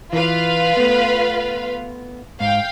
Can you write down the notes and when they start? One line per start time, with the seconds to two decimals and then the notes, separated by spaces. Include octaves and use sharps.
0.13 E3 F4 B4 F5
0.77 A3 B3
2.40 G#2 F5 G5